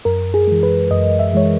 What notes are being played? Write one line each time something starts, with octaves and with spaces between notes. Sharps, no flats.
F#2 A#4
G#4
E3 G#3
B4
F#2 D#5
E5
E3 G#3 C#5